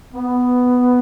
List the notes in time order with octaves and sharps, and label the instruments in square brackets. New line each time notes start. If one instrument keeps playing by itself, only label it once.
[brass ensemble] B3